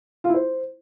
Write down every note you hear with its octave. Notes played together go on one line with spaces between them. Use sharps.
F4
E4
C5